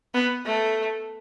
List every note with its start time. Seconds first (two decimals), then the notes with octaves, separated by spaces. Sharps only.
0.14 B3
0.45 A3